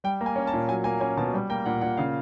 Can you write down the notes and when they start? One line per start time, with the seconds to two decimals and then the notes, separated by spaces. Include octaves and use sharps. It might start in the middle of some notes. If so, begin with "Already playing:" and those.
0.04 G3 G5
0.21 A#3
0.26 G#5
0.36 C#4
0.47 A5
0.53 A#2
0.68 F#3 G#5
0.84 A#3 G#5
1.00 C#4 G#5
1.17 B2 A5
1.34 G3
1.50 A#3 G5
1.66 A#2 F#5
1.81 A#2 F#5
1.97 C#3 F5